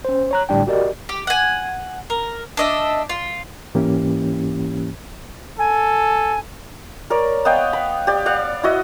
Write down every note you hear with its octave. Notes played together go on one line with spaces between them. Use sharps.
C#4 C5
C#5 A#5 F#6
A2 D3 G3 D4 G5
F#4 G4 A#4 D5 D#5
G4
F#5 G#5
A#4
D4 D#5 E5
F4
G#2 E3 A#3 C#4 E4 G4
A4 G#5
A#4 C#5 D5
B3 D#5 F5 G5
B5
G4 D5
D5 F5 F#5
E4 F#4 D#5